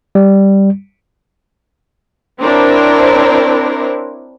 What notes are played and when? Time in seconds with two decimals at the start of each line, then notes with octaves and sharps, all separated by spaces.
0.15 G3
2.40 C4 D4 E4 A#4 C5 C#5